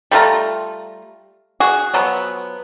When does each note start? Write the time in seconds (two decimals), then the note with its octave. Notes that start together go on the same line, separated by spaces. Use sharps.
0.11 G3 A3 F4 A#5
1.60 F#4 G#4
1.94 F3 F#3 B3